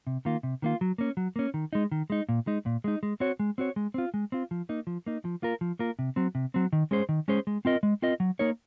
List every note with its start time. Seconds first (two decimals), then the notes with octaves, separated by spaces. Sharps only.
0.07 C3
0.25 D#3 A#3 F4
0.43 C3
0.62 D#3 A#3 F4
0.81 F#3
0.98 A#3 C#4
1.17 F#3
1.36 A#3 C#4
1.54 D#3
1.73 G#3 D#4
1.92 D#3
2.10 G#3 D#4
2.29 A#2
2.47 G#3 D#4
2.66 A#2
2.84 G#3 D#4
3.03 G#3
3.20 C4 F#4 C#5
3.40 G#3
3.58 C4 F#4 C#5
3.76 G#3
3.94 C4 F4
4.14 G#3
4.32 C4 F4
4.51 F3
4.69 A#3 D#4
4.87 F3
5.07 A#3 D#4
5.25 F3
5.42 A#3 F4 A#4
5.61 F3
5.79 A#3 F4 A#4
5.99 C3
6.16 F#3 C4
6.35 C3
6.54 F#3 C4
6.73 D#3
6.91 G#3 C#4 G#4 C5
7.09 D#3
7.28 G#3 C#4 G#4 C5
7.47 G#3
7.65 C4 F4 A#4 D#5
7.83 G#3
8.02 C4 F4 A#4 D#5
8.20 F#3
8.39 A#3 D#4 A#4 C#5